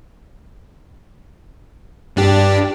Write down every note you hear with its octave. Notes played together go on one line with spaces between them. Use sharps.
G2 D4 G4